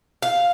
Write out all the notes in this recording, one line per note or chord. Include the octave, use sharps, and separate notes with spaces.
F5